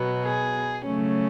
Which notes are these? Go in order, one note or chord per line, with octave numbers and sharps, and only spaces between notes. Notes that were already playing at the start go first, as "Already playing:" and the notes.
Already playing: B2 F#3 B3
G#4
C#3 F#3 A3 C#4